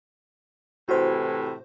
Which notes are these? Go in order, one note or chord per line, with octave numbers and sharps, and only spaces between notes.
A2 C3 E3 F#4 C5